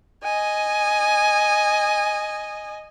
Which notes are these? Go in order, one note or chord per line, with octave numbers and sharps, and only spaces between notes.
D#5 G#5